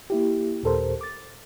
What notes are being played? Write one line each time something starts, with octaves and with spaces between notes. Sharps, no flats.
A#3 E4 G4
D#2 A#2 G4 A4 A#4 C5
D6 A6